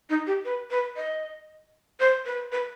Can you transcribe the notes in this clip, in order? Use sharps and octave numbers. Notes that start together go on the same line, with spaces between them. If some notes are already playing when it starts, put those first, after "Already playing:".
D#4
G4
B4
B4
D#5
C5
B4
B4